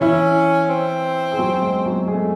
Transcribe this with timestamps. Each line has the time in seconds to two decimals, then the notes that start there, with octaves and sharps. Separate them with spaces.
0.01 E3 C#4 E4
0.70 C4
1.32 G#4
1.39 F#3 F#4
1.62 G#3 G#4
1.86 F#3 F#4
2.08 G#3 A3 G#4